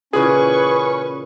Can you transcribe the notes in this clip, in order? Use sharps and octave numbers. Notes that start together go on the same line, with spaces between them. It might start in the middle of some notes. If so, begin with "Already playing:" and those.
A#2 C#3 E3 C#4 G#4 B4 C#6